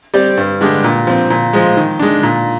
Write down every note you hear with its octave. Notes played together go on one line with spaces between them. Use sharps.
G3 C4 G4 D5
G2
D3 G#3 D4 G4
A#2
F3 C4
A#2
F3 G#3
D#3
G#3 D4
A#2